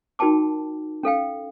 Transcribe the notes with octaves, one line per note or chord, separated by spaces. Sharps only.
D#4 F#4 A#4 G5 A5 D6
C#4 A4 F5 G5